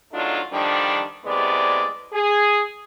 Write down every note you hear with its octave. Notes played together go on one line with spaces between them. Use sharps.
E2 F#3 A3 D4 D#4 F4
D3 D#3 F3 G3 D4
A2 C3 G#3 B3 D5
G#4